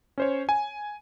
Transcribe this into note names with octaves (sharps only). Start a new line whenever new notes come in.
C#4 C5 C#5
G#5